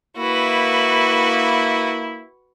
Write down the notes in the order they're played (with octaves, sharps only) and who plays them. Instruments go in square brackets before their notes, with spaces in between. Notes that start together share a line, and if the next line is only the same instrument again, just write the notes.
[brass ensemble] A#3 E4 [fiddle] F#4 B4